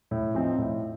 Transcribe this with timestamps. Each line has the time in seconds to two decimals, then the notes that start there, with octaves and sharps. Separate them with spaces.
0.11 A2
0.35 F3 C4 D#4
0.58 A2